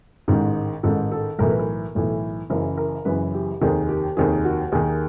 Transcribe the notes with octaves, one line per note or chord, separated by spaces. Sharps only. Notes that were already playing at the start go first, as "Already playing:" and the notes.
A1 G#2 D#3
A1 G#2 D#3 A4
A4
B1 A2 E3 A#4
B4
A#4
B1 A2 E3
F#1 F#2 C#3 E3 A#4
A#4
F#1 F#2 C#3 E3 B4
G4
F1 D#2 D#3 G#4
G4
F1 D#2 D#3 G#4
F#4
D#2 D#3 G#4